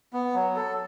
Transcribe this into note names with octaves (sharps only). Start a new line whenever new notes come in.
B3
F#3
A4